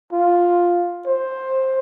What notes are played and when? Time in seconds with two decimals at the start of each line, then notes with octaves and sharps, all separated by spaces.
0.13 F4
1.06 C5